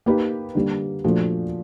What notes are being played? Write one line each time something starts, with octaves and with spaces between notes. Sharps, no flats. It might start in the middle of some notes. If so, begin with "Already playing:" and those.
A#3 D#4 G4 B4
D3 G3 A#3
A#2 F3 A3 D4 F#4